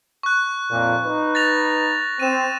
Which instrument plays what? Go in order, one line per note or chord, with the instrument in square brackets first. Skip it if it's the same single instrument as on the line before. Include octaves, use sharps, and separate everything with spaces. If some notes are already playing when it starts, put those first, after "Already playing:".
[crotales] C#6 F#6
[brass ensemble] F2 A#2
D#4 B4
[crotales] A6 A#6 F7
[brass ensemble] C4 [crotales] D#7 E7